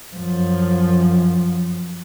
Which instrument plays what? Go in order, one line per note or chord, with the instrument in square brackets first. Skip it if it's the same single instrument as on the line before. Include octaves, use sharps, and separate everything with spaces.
[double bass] F#2 F3